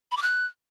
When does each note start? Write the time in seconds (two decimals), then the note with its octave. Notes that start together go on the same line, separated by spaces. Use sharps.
0.11 B5
0.17 D6
0.22 F#6